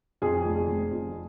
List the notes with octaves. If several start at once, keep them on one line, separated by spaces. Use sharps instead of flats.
F2 F4 G#4
F1
F1
F2